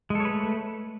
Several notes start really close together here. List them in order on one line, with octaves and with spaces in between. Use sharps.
G#3 A4 C#5 B4 A3